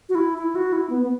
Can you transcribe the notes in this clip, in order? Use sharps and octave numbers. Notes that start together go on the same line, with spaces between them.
F#4
E4
E4
F#4
E4
B3
B3